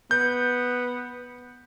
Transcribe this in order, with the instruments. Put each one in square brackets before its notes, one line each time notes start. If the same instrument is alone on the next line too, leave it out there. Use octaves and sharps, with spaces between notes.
[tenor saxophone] B3 [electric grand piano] G6